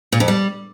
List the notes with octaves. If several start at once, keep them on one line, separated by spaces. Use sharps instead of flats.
A#2
F2
G3